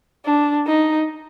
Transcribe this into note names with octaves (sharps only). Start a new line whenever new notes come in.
D4
D#4